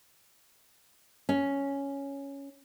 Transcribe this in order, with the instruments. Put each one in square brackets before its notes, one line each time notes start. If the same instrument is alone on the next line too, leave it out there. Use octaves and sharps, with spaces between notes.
[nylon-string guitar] C#4